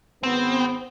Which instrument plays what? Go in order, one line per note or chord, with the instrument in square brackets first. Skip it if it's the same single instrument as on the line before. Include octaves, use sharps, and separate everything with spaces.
[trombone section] G#1 B3 [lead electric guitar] C4